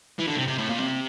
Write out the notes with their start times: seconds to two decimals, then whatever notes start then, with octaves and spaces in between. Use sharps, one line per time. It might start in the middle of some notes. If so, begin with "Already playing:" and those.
0.19 E3
0.28 D3
0.36 C3
0.48 C3
0.58 A2
0.69 A#2
0.80 C3